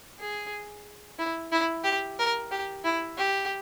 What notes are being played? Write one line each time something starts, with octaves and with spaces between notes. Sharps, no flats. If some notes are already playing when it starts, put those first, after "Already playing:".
G#4
E4
E4
G4
A#4
G4
E4
G4